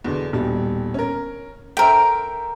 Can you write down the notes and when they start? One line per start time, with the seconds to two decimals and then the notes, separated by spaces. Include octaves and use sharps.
0.04 E2 B2 D3
0.33 D#1 B2 G3
0.94 C#4 A#4
1.77 A4 A#4 C5 E5 G5